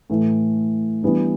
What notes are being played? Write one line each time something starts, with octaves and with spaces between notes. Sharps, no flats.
A2 E3 A3
E3 G3 B3 D4